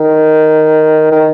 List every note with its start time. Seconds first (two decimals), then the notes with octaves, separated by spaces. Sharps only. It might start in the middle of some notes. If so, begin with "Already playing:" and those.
Already playing: D#3
1.12 D#3